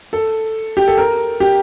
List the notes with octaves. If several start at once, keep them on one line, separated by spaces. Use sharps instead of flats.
A4
G4
A4
A#4
G4